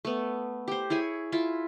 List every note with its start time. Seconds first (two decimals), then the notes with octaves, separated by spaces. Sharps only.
0.05 A3 B3
0.68 G4 C5
0.90 E4 G#4 C#5 G#5
1.32 E4 F4 E5